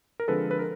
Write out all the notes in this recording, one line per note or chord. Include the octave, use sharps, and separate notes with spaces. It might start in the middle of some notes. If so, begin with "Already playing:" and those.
A#4
D3 F3 G#3 C4 A4 B4
B4
A#4